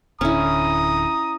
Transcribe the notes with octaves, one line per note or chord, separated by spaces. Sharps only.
D1 D3 C#4 E4 A#5 D#6